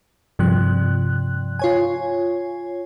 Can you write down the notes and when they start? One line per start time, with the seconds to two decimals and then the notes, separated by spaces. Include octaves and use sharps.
0.39 G2 C3 F3 F#6
1.59 F4 C#5 G#5